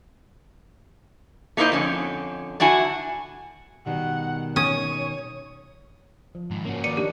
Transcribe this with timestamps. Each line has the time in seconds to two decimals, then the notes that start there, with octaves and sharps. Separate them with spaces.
1.57 A3 A#3 D#4 E4 C5 D#5
1.72 F2 D3 C#4
2.60 D3 D4 E4 F#4 G#5
3.86 B2 D#3 G3 F#5
4.56 C#4 C#5 D#6
6.35 F3
6.51 G#2 D#3
6.65 A#3 C#4 F#4
6.84 D#3 B4 D5 C#7 D#7
6.97 D4 D#4 G4 A#4